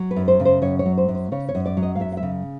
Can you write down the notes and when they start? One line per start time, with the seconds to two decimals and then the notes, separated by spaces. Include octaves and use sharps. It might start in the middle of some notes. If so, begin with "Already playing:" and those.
Already playing: F#3
0.11 B4
0.16 F#2
0.28 C5
0.40 C#3
0.45 C5
0.62 F#2 C#5
0.79 C#5
0.86 F#3
0.97 C5
1.08 F#2
1.15 C5
1.32 C#3 C#5
1.49 C#5
1.55 F#2
1.66 D5
1.77 F#3
1.82 D#5
1.95 F5
2.00 F#2 E5
2.12 F5
2.17 E5
2.23 C#3